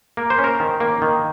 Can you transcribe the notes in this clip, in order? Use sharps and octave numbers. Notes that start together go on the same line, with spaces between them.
A#3 A#4
C5
C#4
A#4
D#3
A#3
D#3